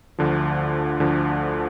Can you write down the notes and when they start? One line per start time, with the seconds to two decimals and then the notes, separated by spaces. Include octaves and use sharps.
0.19 D2 D3 F3
1.00 D2 D3 F3